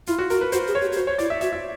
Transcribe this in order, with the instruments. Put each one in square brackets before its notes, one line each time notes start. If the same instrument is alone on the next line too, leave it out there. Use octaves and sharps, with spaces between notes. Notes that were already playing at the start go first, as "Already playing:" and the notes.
[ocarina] E4 [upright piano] F4
[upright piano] F#4
[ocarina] F#4 [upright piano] A#4
[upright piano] B4
[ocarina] F#4 [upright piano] C5
[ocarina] G#4
[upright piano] C#5
[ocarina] G4
G4
[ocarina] F#4 [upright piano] C5
[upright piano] C#5
[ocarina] E4 [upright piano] D5
[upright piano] E5
[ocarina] F#4 [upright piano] E5
[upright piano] E5